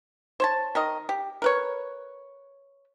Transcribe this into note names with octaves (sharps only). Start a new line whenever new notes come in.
C5 C#5 A5
D#3 A#4 D#5
G4
A#4 B4 C#5